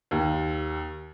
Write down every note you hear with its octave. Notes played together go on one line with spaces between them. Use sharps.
D#2